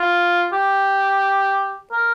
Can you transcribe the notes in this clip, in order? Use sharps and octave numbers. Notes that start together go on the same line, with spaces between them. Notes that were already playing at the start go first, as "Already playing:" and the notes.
Already playing: F4
G4
A#4